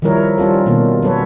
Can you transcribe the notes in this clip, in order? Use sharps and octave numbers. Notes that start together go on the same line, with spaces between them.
D#3 F3 G3 E4 A#4 C#5
G3 C#4 F4 A4
B2 D#3 A#3
F#3 C#4 A4 B4 C#5